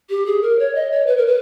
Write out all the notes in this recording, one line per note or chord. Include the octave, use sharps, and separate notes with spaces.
G4
G#4
A#4
C#5
D#5
C#5
B4
A#4
B4